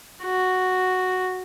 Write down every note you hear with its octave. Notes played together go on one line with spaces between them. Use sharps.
F#4